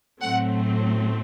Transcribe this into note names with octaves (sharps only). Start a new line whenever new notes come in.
A2 F#3 A3 C4 F#5